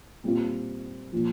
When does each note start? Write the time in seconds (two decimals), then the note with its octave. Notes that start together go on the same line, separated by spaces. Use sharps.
0.24 A#2 G3 C4 F4
1.12 A#2 F3